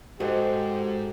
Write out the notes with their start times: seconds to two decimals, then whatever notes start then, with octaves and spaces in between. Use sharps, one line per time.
0.20 G#2 F#4 G4 A4 C5 D#5 F#5